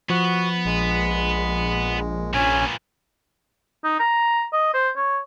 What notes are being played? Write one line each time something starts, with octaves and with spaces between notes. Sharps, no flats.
F3 B3 F#4
A#1 G#3
A#2 B3 C#4 G#5
D#4
A#5
D#5
C5
C#5